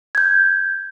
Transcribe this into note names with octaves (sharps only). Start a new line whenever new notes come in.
G6 G#6